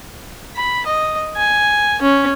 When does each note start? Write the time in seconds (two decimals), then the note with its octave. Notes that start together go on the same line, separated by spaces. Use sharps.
0.56 B5
0.86 D#5
1.37 G#5
2.02 C#4